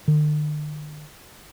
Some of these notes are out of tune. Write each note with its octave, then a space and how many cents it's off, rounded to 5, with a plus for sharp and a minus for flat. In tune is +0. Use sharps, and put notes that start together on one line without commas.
D3 +45